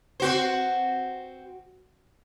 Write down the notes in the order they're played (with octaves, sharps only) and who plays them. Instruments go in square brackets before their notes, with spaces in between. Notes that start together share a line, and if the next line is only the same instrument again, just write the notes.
[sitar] C4 F#4 C5